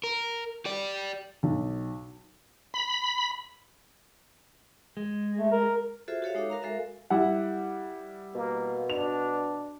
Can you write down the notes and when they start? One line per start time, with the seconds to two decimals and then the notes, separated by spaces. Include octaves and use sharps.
0.04 A#4
0.65 G4 D5
1.43 B1
2.74 B5
4.97 G#3
5.37 A3
5.52 A#4
6.08 F4 F#4 G#4 A4 C5 E5
6.22 F#4 G4 A4 C#5 E5 F5
6.35 G#3 D#4 C#5 F5 D6
6.50 F#4 A#4 F5 A#5
6.62 G#3 A4 A#4 E5 F5
7.10 G3 E4 F#5
8.35 B2 A#3
8.90 D4 F7